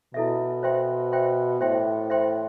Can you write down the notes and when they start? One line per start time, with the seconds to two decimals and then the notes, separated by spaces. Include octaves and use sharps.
0.14 B2 E4 A4 E5
0.63 C5 E5 G5 C6
1.12 C5 E5 G5 C6
1.61 A2 C5 E5 G5 C6
2.10 C5 E5 G5 C6